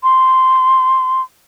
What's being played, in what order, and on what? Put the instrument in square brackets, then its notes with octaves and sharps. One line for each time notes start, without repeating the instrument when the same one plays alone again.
[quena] C6